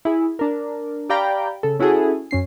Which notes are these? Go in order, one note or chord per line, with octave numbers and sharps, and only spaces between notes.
E4 G#4
D4 A#4
G4 D5 F5 G5 A#5 B5
C#3 A4
C#4 E4 F#4 G#4 A4
F#2 C#4 C7